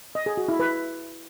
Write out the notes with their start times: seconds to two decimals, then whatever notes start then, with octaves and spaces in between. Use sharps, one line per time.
0.15 D#5
0.26 G#4
0.37 F#4
0.48 E4
0.60 B4